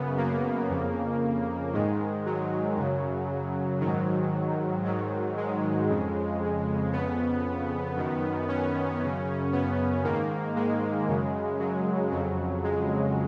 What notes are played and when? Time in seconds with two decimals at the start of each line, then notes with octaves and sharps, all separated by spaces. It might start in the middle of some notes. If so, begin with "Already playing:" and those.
Already playing: F#2 C#3 B3
0.17 A#3
0.70 F2 C#3
1.73 G#2 D#3 G#3
2.26 F#3
2.77 F#2 C#3
3.81 D#3 F#3
3.86 G#2
4.84 G#2 D#3 F#3
5.37 G#3
5.89 F2 C#3
6.93 F2 C#3 B3
7.96 F#2 D#3
8.49 C#4
9.00 F#2 C#3
9.53 B3
10.04 G#2 D#3 A#3
10.56 G#3
11.08 F#2 C#3
11.59 F#3
12.11 F2 C#3 F#3
12.64 G#3